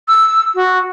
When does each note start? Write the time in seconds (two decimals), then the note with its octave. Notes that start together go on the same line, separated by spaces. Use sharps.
0.09 E6
0.55 F#4